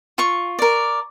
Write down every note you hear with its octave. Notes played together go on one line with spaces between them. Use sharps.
F4 C#6
A#4 D5